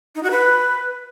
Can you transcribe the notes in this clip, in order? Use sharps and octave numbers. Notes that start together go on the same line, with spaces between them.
D#4
F#4
B4